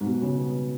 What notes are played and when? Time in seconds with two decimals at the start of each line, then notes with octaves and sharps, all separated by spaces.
0.01 G#2
0.07 B2
0.22 C#3
0.37 B3